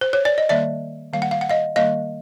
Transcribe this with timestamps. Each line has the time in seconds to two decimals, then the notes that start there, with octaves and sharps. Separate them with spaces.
0.01 C5
0.13 C#5
0.25 D5
0.38 D#5
0.49 D#3 G3 A#3 D5 E5
1.13 D#3 G3 A#3 F5
1.22 F#5
1.31 F5
1.41 F#5
1.50 D#5 F5
1.76 D#3 G3 A#3 D#5 F5